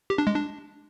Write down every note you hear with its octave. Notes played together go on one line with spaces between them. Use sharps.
G4
D4
G#3
D4